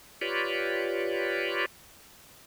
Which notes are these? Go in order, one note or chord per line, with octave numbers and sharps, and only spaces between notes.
F4 G4 B4 C#5 D5